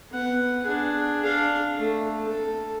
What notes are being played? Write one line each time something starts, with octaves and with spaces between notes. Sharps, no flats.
B3 F#5
D4 G#4
D4 F5
A3
A4